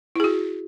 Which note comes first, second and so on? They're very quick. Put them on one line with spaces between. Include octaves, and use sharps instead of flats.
E4 G#4 F#4